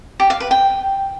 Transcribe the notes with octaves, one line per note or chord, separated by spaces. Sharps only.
G4
F5
B4
G5